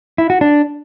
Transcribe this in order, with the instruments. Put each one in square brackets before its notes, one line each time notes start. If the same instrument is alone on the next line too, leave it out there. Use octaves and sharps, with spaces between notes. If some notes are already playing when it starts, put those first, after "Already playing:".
[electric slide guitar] E4
F#4
D4